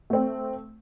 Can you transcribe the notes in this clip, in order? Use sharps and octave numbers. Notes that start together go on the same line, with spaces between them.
A3 C4